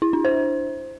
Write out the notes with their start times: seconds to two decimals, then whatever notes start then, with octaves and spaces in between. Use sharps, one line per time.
0.02 E4
0.13 D4
0.25 C5